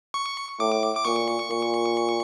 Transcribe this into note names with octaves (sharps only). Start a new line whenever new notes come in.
C#6
A2 D6
D6
A#2 C#6
A#2